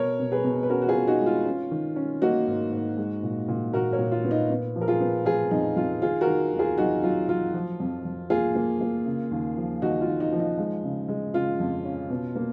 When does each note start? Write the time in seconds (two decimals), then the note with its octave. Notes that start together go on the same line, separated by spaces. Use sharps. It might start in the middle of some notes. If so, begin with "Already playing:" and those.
Already playing: B2 A#4 C#5
0.19 B2
0.32 G#4 B4
0.44 B2
0.63 B4
0.69 C#4 F#4 A#4
0.82 F#4
0.88 F4 G#4
0.95 B2
1.07 D#4 F#4
1.21 G#3
1.26 F4
1.45 C#4
1.71 D#3
1.96 C#4
2.22 A#3 D#4 F#4
2.47 G#2
2.72 G#2
2.97 G#3
3.23 A#2
3.48 A#2
3.73 A#2 F#4 A#4
3.93 A#4 C#5
3.99 A#2
4.12 F4
4.24 B3
4.31 D#4
4.50 B3
4.76 F3
4.81 A#4
4.88 F4 G#4
5.00 B3
5.25 F3 F4 G#4
5.51 F2 D#4
5.76 F2 F4
6.02 D#3 F4 G#4
6.21 F#4 A#4
6.27 D#3
6.53 D#2
6.59 F4 G#4
6.78 F#3 D#4 F#4
7.03 F#3 F4
7.29 F#3 F4
7.54 F3
7.80 F2
8.05 F2
8.30 A#3 F4 G#4
8.55 A#3
8.81 A#3
9.06 C#3
9.31 D#2
9.57 F3
9.82 D#2 D#4 F#4
10.01 F4
10.08 D#2
10.20 D#4
10.32 F3
10.39 D#4
10.58 G#3
10.84 C#3
11.08 G#3
11.34 C#3 F4
11.60 F2
11.85 C#4
12.10 B2
12.35 A#3